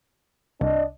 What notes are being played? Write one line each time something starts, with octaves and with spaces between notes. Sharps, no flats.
C2 D4 D5 D#5